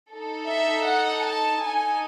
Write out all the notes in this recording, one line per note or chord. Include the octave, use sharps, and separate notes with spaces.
D#4 A4
E5
F#5
A5
D#4 A4 G#5